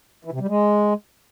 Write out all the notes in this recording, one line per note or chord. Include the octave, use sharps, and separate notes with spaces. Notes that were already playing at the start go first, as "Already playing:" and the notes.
E3
C3
G3
G#3